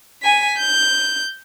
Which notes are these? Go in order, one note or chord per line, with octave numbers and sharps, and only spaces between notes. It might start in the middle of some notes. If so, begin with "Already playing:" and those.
G#5 B6
G6